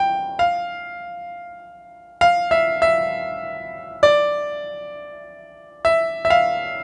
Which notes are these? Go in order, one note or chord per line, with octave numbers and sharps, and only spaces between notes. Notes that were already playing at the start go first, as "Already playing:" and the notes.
Already playing: G5
F5
F5
E5
E5
D5
E5
E5
F5